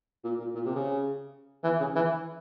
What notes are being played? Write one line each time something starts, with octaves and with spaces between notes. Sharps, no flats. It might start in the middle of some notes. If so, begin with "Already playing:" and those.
A#2
A#2
A#2
C3
C#3
E3
C#3
E3